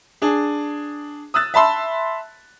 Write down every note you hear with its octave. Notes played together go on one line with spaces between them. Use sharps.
D4 G#4
D#6 E6 F#6 A6
E5 A5 B5 C6 E6